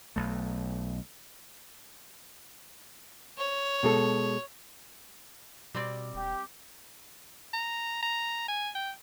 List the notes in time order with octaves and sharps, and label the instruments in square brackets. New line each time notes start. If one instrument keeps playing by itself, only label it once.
[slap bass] B1 A3
[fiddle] C#5
[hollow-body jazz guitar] B2 G#3 A4
[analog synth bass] B2 [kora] G3 C4 D5
[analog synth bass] E1 [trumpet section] G4
[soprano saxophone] A#5
A#5
G#5
G5